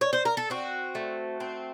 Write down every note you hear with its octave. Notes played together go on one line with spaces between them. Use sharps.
C#5
C5
A#4
A4
C4 F#4
A3
C4